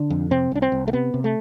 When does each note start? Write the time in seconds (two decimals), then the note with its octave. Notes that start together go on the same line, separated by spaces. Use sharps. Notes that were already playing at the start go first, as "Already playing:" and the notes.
Already playing: D3 D4
0.10 F2
0.31 C3 C4
0.51 C2 D4
0.62 C4
0.72 C2
0.88 A3
0.93 C3 B3
1.14 C3
1.24 A3